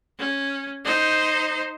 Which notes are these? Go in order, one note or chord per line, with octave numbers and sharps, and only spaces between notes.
C#4
D#4 C5